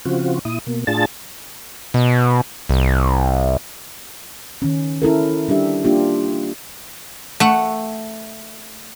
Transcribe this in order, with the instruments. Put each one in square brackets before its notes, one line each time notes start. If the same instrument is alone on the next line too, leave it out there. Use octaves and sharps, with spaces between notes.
[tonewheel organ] C#3 F3 C4 F4 F#4
A#2 E4 D#6
B2 A#3
A2 D4 F4 G#4 A5 A6
[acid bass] B2
C2
[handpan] D#3 C#4
C#4 E4 A4 A#4
G3 D4 G4 E5
A#3 D4 F4 G4
[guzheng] A3 F#5